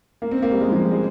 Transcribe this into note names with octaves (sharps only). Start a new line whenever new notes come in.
A#3
C4
A#3
G3
G#3
F3
G#3